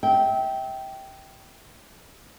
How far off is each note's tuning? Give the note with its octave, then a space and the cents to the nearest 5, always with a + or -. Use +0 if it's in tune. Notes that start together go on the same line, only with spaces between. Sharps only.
E5 -30 G5 -10